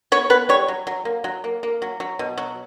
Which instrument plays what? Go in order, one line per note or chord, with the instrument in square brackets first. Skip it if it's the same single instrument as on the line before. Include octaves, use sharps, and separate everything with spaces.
[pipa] B3 C#5
B3 B4
G3 C#5
F#3
F#3
A#3
F#3
A#3
A#3
F#3
F#3
B2
F#3